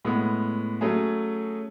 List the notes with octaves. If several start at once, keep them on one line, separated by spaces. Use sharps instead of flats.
A2 G#3 B3
F#3 A3 C#4 G#4